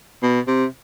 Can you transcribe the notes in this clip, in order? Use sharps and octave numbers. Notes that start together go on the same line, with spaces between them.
B2
C3